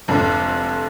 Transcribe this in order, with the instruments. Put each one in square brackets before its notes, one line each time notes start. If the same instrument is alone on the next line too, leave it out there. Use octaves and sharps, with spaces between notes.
[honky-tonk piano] F1 F2 D3